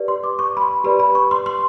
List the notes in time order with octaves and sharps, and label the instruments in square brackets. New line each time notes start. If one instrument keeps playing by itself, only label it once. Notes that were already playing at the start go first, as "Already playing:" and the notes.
Already playing: [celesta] G4 B4 D5
C6
D6
C#6
B5
C6
G4 B4 D5 B5
B5
C#6
C6
C6